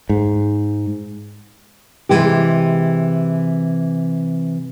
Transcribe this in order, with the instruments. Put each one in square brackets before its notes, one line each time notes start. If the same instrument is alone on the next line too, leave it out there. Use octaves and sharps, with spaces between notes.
[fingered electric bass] G#2
[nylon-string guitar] C3 E3 G#3 G4